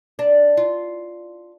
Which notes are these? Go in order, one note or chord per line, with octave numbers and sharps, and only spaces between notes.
D4
F4